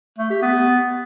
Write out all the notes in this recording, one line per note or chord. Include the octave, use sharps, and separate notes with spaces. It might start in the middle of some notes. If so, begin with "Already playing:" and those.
A3
G4
B3